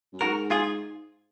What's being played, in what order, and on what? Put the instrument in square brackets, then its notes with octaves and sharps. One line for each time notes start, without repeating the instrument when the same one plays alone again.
[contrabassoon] F#2
[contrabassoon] G#2 [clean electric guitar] F#4 A#4
[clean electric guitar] F4 G#4